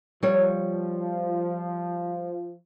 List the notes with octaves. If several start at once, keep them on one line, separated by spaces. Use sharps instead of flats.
F3 G3 C#5